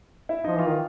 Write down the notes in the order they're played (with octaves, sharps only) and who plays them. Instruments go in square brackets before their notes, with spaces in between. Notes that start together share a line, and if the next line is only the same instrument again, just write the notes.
[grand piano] E4 E5
[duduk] F3 [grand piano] D#4 D#5
[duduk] E3 [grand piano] F4 F5
[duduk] D#3